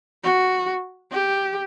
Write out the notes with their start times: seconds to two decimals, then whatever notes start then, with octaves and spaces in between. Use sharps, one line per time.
0.24 F#4
1.11 G4